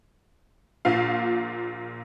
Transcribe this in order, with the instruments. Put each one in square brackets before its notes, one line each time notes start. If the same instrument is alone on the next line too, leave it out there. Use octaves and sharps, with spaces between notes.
[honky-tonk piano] A#1 A#2 F4 F5